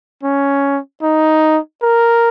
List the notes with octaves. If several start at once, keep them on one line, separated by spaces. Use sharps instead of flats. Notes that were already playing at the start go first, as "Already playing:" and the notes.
C#4
D#4
A#4